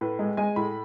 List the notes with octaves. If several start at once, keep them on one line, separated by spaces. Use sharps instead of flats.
A2 B4
G#3
G#3 G#5
A2 B5